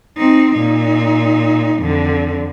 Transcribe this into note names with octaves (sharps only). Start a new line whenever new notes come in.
C4 D#4
A#2 D#4
F2 D3